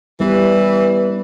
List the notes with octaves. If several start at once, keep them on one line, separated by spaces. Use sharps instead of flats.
E3 G3 B3 B4